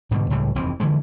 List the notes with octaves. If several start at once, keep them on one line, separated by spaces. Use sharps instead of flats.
G#2 B2 D3 G3
C#2 A2 C#3 G3
F1 D#2 E3 C4
D3 E3 F3 G#3